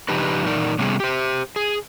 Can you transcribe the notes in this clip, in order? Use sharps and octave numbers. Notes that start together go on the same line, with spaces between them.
C#3 F3 D4 D#4 G4 B4
A#2 E3 D#4 A#4 D5
C3 G3 A3 B3 C#4 G#4
G4 C5
G#4